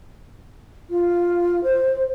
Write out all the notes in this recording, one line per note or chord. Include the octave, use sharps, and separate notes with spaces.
F4
C5